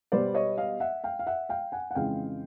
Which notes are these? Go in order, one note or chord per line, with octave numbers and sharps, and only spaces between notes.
B2 G3 B3 C5 D5
C#5 D#5
D#5 F5
E5 F#5
F5 G5
F5
E5 F#5
F5 G5
F#5 G#5
F#5
F2 C#3 E3 G#3 F5 G5